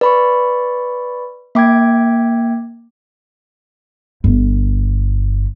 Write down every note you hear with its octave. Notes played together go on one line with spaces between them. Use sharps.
B4 D5 B5 C#6
A#3 E5 G5 D6 G#6
G1